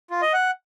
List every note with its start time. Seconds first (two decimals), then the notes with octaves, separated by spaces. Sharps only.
0.10 F4
0.22 D#5
0.33 F#5